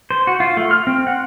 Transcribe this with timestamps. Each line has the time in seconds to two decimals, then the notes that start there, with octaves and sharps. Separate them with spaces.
0.11 C5
0.27 F#4
0.40 F4
0.57 A3
0.71 F6
0.87 C4
1.07 F#5